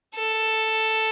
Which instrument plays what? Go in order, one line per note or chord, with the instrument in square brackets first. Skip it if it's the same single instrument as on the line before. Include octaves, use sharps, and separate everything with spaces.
[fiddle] A4